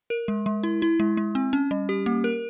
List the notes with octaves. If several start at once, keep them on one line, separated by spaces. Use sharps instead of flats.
A#4
G#3
G#3
E4
E4
G#3
G#3
C4
C#4
G3
G4
A#3
A#4